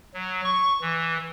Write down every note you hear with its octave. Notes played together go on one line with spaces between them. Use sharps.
F#3
C#6
E3